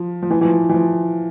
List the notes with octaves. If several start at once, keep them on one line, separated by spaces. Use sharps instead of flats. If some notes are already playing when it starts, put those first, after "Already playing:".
Already playing: F3
F3
E3
E3
F3
E3
F3